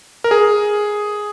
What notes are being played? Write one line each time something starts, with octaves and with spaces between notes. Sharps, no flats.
A#4
G#4